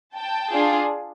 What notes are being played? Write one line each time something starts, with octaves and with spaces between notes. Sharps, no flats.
G5 A5
D4 F4 G#4